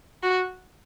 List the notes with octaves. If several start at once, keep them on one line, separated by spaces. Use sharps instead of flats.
F#4